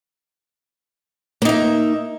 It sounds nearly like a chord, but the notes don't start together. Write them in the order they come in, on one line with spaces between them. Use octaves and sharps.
A#3 D#4 E5